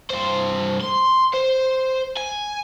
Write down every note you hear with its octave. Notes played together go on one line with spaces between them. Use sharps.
G2 C5
C6
C5
G#5